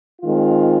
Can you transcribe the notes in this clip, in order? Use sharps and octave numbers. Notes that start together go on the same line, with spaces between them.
D#3 G#3 C4 F4